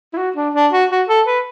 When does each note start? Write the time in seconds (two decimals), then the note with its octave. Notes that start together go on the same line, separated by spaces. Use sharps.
0.13 E4
0.17 F#4
0.36 D4
0.54 D4
0.72 F#4
0.90 F#4
1.08 A4
1.26 B4